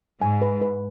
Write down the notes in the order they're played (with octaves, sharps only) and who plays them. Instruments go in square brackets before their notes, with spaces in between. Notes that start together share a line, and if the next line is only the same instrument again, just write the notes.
[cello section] G#2 [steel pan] G#5
[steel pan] B4
B4